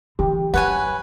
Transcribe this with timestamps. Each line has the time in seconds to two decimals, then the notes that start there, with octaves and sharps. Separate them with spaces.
0.19 D3 E3 G4
0.54 F#2 B4 C#5 F#5 G#5